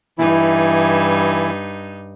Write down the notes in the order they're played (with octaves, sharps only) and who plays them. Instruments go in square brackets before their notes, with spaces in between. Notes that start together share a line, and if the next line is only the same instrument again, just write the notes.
[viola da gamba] G2 D#4 [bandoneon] E3 E4